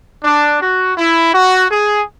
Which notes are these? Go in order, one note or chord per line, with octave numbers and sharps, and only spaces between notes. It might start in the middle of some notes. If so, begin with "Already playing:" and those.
D4
F#4
E4
F#4
G#4